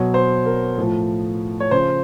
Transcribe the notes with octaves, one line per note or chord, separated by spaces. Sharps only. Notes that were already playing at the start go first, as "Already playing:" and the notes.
Already playing: B2 F#3 C#5
C5
A#4
A2 F3
C#5
C#3 F3 C5